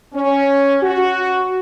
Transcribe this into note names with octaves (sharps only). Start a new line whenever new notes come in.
C#4
F#4